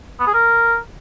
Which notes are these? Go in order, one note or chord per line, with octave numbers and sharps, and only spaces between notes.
B3
G#4
A#4